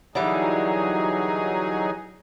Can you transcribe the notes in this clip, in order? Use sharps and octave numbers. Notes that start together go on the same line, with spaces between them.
D3 E3 F#3 G3 D#4 G#4